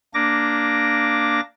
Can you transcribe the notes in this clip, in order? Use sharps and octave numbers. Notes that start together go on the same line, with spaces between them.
A#3 D4 D6 A#6